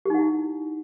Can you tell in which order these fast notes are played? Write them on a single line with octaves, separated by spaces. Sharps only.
G4 D#4 F#5 E4